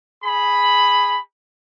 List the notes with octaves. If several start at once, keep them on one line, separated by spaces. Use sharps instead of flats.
G#4 B5